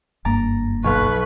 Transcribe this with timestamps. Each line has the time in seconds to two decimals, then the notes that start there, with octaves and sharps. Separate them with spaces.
0.25 F#1 G2 A#3 A#5 D6 A6
0.84 B1 B4 F5 F#5 C#6